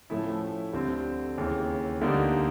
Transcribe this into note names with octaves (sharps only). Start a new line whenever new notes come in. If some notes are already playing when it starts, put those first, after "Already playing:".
A2 F3 A3 C#4 E4
D2 D3 G3 C4
D#2 C#3 E3
D2 D3 G3 A#3 D#4